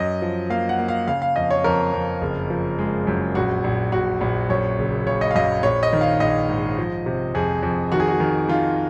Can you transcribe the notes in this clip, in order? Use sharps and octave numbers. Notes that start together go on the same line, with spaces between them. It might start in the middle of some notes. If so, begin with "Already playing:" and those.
Already playing: F#2 D#5
F3
A#3 F5
F#5
A#3
F5
C#3 F5
F5
F2 D#5
C#5
F2 A#4
F2
F#1
F3
G#3
F#2
A#1 F#4
A#1
A#1 F#4
A#1
F#2 C#5
F#1
C#3 C#5
D#5
F5
F#2 D#5
A#1 C#5
D#5
D#3
F5
A#1 D#5
G#2
F3
C3
F2 G#4
F2
D#3 F#4
G#4
F#4
D#3
D#3 F4